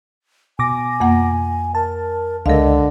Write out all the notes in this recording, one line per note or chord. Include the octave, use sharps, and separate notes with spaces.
B2 G#5 D6 A#6
F2 A#3 F#5
A#4 A5
C#2 D3 G#3 A#4 D#5 F5